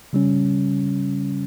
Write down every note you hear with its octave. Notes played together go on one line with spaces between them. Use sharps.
C#3 G3 C#4